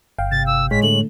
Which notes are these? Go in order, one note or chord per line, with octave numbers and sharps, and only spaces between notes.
G1 F5 G5
C3 A6
E6
A2 G#3 C#5 B6
D3 A3 F#7